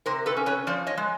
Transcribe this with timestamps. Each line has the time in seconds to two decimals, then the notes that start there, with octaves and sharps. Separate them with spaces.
0.06 C3 A#4 C5
0.26 A4 B4
0.37 C#4
0.46 B4 C#5
0.67 F3 C5 D5
0.87 C#5 D#5
0.97 G#3